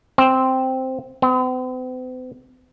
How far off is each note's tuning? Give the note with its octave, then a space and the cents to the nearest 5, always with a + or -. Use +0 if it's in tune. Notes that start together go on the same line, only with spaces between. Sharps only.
C4 +0
C4 -45